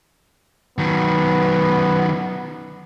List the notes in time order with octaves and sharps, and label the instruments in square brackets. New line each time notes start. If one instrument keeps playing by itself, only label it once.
[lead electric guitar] D#3 F#3 [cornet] B3